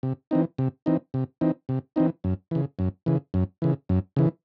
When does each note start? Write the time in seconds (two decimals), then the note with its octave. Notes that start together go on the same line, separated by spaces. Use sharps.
0.03 C3
0.31 E3 C4 D#4
0.58 C3
0.86 E3 C4 D#4
1.14 C3
1.41 E3 C4 D#4
1.69 C3
1.96 E3 C4 D#4
2.24 F#2
2.51 C#3 E3
2.79 F#2
3.06 C#3 E3
3.34 F#2
3.62 C#3 E3
3.89 F#2
4.16 C#3 E3